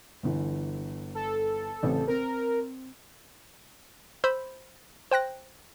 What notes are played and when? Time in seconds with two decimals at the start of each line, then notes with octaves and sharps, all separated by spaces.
0.23 G1 D3 E3
1.15 A4
1.83 A1 C#3 C4
2.07 C4 A#4
4.24 C5 B5 E6 G6
5.11 C5 G5 F#6 A#6